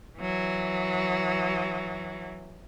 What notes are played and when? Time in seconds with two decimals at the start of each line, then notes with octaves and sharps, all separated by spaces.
0.18 E3 F#3